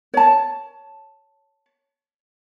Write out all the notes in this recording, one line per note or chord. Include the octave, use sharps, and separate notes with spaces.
C#5 A5